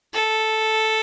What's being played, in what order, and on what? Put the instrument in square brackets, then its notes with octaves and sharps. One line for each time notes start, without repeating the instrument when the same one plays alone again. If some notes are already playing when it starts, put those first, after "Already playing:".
[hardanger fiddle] A4